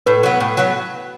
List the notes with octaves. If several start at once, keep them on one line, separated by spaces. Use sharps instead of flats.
A2 B4
F#3 B3
A2
F#3 B3